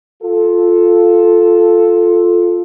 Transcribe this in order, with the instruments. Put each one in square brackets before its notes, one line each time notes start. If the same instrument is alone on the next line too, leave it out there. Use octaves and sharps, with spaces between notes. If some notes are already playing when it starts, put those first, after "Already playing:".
[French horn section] F4 A4